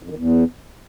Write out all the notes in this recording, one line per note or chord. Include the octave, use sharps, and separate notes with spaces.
F2
D#3
E2